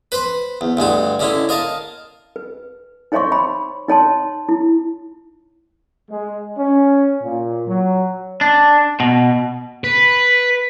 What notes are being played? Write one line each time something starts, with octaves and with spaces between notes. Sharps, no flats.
B4 C5 B5 C6
E2
D2 G2 G#3 F#4
D3 G#3 C#4 E4
A#4 D#5 F5 A5 A#5
B4
D#4 C5 C#5 E5 C6 C#6
B5 C6
D#4 C#5 A5 C6
E4
G#3
C#4
A#2
F#3
D4
B2
B4 B6